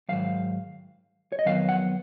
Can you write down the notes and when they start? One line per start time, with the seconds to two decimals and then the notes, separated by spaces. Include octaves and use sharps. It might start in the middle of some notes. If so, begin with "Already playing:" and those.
0.09 G#2 D#3 F#3 F5
1.32 C#5
1.39 D#5
1.45 F2 D#3 F#3 B3 F5
1.69 F#5